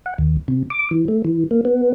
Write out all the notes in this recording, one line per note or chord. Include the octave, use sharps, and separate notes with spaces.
F#5
D#2
C3
D6
E3
A3
E3
A#3
B3